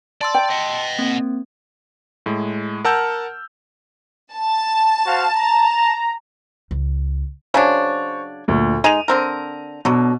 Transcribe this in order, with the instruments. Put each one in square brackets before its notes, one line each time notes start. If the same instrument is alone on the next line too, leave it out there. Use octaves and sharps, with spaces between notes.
[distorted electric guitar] D5 [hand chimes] A5 C6 E6
[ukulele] G5
[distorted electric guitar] D#5 F#5
[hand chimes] A#3 C4
[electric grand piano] A2 G#3
A#4 F#5 A5 E6 F6 G6
[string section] A5
[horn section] F#4 C5 F5
A#5
[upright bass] C#2
[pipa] C#3 F#3 D4 [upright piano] C5 C#5
[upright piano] D2 A#2
[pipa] G#3 D#4 [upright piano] D#7 F7
[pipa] D3 C4 A#4
[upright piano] B2 [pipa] D3 F#3